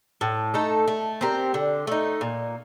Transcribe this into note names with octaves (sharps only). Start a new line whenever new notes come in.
A2
A3 D#4 A4
A3
C4 G4 A#4
D3
A3 D#4
A#2